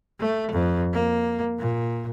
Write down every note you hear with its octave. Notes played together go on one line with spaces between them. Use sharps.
A3
F2
A#3
A#2